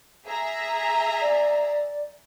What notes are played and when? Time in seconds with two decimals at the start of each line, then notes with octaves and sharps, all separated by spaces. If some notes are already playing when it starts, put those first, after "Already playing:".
0.25 G#4 E5 A#5
1.21 D5